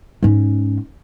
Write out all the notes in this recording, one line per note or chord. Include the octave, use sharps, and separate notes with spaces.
G#2 C#4